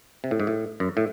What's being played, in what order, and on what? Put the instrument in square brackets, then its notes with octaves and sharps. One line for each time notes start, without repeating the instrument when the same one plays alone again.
[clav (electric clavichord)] C3
A2
G#2
A2
F#2
A2